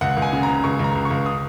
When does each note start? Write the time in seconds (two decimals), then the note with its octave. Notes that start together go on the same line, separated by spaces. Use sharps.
0.01 C#2 F#5
0.17 C#2
0.22 G#5
0.33 C#3
0.43 A#5
0.48 C#3
0.64 C#2 C#6
0.79 C#2 A#5
0.95 C#2
1.05 C#6
1.11 C#2
1.26 D#6